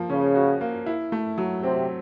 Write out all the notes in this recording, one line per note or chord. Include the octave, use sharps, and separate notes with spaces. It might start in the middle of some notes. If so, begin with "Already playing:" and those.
Already playing: F3 A#3
C#3 C#4
F#4
A#3
E4
A3
F#3
C3 C4